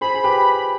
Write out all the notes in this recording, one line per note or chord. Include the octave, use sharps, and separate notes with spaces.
G#4 C5 B5
G#4
G4 B4